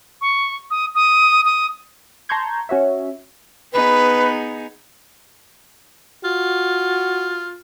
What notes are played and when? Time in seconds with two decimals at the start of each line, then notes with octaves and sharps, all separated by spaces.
0.21 C#6
0.71 D#6
0.95 D#6
1.45 D#6
2.29 A5 A#5 C6 C#6 G6 G#6
2.69 C#4 F#4 C#5 E5
3.73 B3 D#4 G#4 B4
6.25 F4 F#4